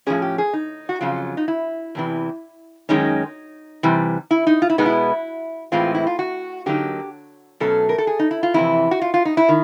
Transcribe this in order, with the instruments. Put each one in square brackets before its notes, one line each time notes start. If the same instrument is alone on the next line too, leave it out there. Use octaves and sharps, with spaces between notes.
[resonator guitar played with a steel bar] A2 F3 A#3 C#4 G#4
G4
G#4
D#4
F#4
F2 C#3 F#3 F4
D#4
E4
E2 C3 E3
F#2 D#3 G#3 C#4 D#4
C3 E3 G3
E4
D#4
F4
E4
B2 G#3 B3 D#4
E4
A2 E3 G#3 C4 F4
E4
F4
F#4
D3 F#3 A#3 D#4 G4
B2 F#3 A3 C#4 A4
A#4
A4
G#4
D#4
E4
F4
F2 C3 E3 E4
F#4
F4
F4
D#4
E4
D#3